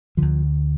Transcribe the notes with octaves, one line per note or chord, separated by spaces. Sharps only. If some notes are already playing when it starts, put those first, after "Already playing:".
D2 D3 F3